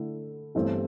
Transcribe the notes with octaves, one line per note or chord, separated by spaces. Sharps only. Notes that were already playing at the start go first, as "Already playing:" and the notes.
Already playing: D3 A3 E4
G1 G2 E3 A3 C4